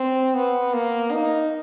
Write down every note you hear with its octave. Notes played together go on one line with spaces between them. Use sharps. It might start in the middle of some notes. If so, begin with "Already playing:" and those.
Already playing: C4
B3
A#3
D#4